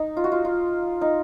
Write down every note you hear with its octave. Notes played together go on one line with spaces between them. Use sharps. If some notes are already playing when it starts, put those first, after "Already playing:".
Already playing: D#4
F4
F#4
F4
F4
D#4